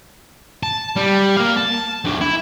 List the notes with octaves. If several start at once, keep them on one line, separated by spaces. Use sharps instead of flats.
A5
G3
A#3 F5
A5
F#3 D4
E4